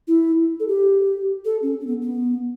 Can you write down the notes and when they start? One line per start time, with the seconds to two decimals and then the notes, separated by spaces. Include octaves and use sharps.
0.08 E4
0.60 A4
0.68 G4
1.45 A4
1.62 C#4
1.80 C#4
1.87 B3
2.02 B3